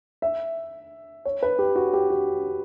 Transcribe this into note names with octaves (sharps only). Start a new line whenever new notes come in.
E5
C#5
B4
G4
F#4
G4
F#4